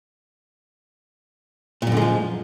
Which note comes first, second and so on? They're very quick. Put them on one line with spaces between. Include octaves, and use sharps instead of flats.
A#2 F#2 D3 G#3 F3